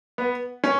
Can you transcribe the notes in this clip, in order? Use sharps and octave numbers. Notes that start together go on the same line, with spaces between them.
B3
C#4